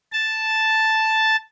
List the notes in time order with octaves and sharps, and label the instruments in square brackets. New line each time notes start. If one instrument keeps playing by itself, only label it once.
[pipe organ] A5